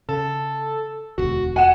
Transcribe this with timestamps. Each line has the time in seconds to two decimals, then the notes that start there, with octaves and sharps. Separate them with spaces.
0.09 C#3 A4
1.18 E1 D2 F#4
1.56 F#5 G#5 E7